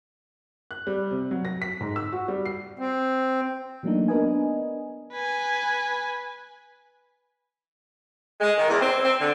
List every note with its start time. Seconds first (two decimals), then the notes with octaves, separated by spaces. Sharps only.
0.71 F#6
0.87 G3
1.11 C3
1.31 F#3
1.45 A#6
1.62 B6
1.81 G#2
1.96 E6
2.12 F#4
2.28 G3
2.46 C7
2.79 C4
3.83 E3 F#3 A3 A#3 D4 D#4
4.08 B3 D4 A#4 B4 D#5 G#5
5.13 B4 G#5
8.40 G#3
8.57 D#3
8.69 E2
8.81 C4
9.04 C4
9.19 D3